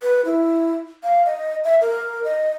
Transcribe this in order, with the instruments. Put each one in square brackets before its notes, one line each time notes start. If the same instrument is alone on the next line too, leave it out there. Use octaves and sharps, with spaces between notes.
[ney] B4
E4
F5
D#5
E5
A#4
D#5